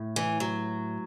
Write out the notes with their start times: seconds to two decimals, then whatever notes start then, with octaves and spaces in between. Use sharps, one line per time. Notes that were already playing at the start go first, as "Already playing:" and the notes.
Already playing: A2
0.16 E3
0.40 F#3